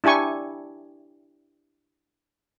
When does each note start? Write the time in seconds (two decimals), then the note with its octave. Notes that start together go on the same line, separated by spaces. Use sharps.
0.04 D4 E4 G4 G#5 C#6